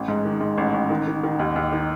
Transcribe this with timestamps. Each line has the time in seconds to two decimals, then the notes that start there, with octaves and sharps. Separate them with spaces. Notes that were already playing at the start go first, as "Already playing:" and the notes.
Already playing: A1
0.08 G#2
0.25 D#3
0.41 G#2
0.58 A1
0.74 A1
0.90 D#3
1.07 D#3
1.23 D#3
1.39 D#2
1.56 D#2
1.73 D#3